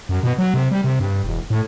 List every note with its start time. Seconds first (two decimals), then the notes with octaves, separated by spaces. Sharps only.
0.09 F#2
0.23 B2
0.38 F#3
0.54 C3
0.71 G3
0.84 C3
0.99 G2
1.24 E1
1.50 A2